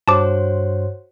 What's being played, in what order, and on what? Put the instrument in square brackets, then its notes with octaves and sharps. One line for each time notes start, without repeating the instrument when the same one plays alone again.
[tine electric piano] G2 [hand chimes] F#4 C5 C#5 [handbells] A5 D6